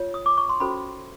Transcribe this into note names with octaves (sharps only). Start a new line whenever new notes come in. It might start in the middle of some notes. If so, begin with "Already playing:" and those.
Already playing: F4 C#5
D#6
D6
C#6
C6
C#4 F#4 A4 C5 B5